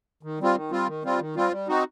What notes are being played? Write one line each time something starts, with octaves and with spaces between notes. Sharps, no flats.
D#3
G3 C4 F4
D#3
G3 C4 F4
D#3
G3 C4 F4
D#3
G3 C4 F4
G3
C4 D#4 F#4